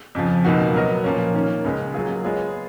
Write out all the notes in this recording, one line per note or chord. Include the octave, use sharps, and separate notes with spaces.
F2 C#3 F3
C#2 B2 A#3 D#4 F#4
F#3 B3 F#4 A#4 D#5
A#2 F3 A#3 C#4
D#3 A#3 C#4
C#2 C#3 G#3
F#3 A#3 F4 G#4
G#3 B3 F4 G#4 C#5